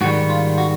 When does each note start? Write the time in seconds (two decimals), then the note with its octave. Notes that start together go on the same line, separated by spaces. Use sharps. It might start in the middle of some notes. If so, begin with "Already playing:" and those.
0.01 G#2 D#3 G3 F#4
0.29 F4
0.58 F#4